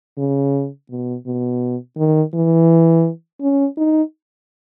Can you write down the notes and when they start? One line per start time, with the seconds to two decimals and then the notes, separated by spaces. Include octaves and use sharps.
0.18 C#3
0.90 B2
1.26 B2
1.98 D#3
2.34 E3
3.41 C#4
3.77 D#4